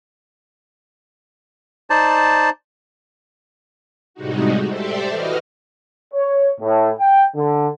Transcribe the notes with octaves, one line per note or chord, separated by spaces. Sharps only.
D#4 C5 D5 A5
A2 C3 G3 G#3 D#4 F#4
G4 A4 C5 D5 E5
E3 F#4 B4 D#5 F6
C#5
A2
G5
D3